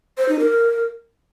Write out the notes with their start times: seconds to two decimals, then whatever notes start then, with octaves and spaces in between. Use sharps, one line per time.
0.18 C5
0.29 D#4
0.39 A#4